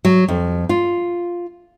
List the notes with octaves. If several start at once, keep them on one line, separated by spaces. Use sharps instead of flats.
F#3
F2
F4